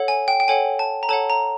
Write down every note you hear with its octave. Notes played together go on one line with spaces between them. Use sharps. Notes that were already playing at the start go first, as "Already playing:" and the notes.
Already playing: A4 C#5 F#5
G#5
G5
G5
A4 C#5 F#5 G#5
A5
A#5
A4 C#5 F#5 A5
A#5